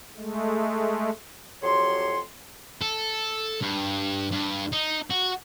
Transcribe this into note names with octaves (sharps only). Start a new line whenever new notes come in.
G#3 A3
F2 F#3 G4 C#5 C6
A4
G2
G2
D#4
F#4